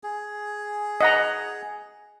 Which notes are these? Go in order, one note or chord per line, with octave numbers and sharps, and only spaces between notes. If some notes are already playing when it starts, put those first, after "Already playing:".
G#4
D#5 F#5 A#5